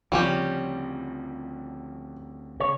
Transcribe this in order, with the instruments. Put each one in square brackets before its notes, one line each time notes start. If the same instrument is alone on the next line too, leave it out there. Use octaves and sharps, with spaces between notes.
[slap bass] D2 C#3 C4 [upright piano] F3 [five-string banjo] G3 C#4 G4
[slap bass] C#3 [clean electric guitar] C#5